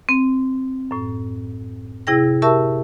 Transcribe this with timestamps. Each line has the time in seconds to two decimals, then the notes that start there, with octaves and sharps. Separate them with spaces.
0.09 C4
0.91 F#2 A2
2.07 C3 E4 G#4 G5 A#6
2.42 G4 A#4 E5 A5 C#6 E6